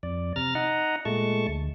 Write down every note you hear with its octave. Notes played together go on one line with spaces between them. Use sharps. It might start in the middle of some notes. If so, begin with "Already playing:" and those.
F2 D5
C3 A#5 F6 A6
D#4 D#5 F#5 A#5
A#2 G#3 A3 A5 C#6
D2